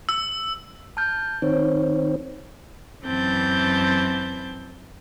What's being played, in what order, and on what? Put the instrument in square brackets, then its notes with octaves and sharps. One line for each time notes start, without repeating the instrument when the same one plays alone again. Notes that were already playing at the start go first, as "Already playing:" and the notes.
[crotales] E6
[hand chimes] A5 F6 G6
[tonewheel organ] D#3 C4 [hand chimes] C#5
[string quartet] F#2 E3 C4 A5 G6